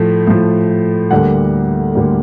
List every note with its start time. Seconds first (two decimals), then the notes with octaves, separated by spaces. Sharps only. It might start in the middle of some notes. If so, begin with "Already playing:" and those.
Already playing: A2 F3 A3
0.27 A2 F3 A3
1.11 D2 D3 G3 A#3 F#5
1.95 D2 D3 G3 A#3